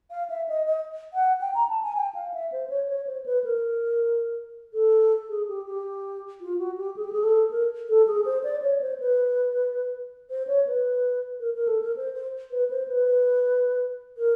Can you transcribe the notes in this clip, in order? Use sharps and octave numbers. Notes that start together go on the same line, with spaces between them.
F5
E5
D#5
D#5
F#5
G5
A#5
A5
G#5
G5
F5
E5
C5
C#5
C#5
C5
B4
A#4
A4
G#4
G4
G4
F4
F#4
G4
G#4
G4
G#4
A4
A#4
A4
G#4
C5
D5
C#5
C5
B4
C5
C#5
B4
A#4
A#4
A4
A#4
C5
C5
B4
C5
B4
A#4